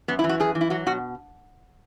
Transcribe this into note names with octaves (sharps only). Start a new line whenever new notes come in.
F#2 B3
E4
E3
F#4
F#2 G#4
E3
E4
F#3 F#4
B2 F#4